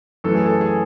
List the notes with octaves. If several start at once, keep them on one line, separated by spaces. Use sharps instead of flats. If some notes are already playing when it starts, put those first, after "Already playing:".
F#2 E3 A3 A4
G#4
A4
G#4